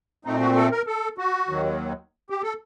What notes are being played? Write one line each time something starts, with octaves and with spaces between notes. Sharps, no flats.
A#2 A3 C4 D#4
F#4
A4
A#4
A4
F#4
D#2 D#3 F#3
G4
A4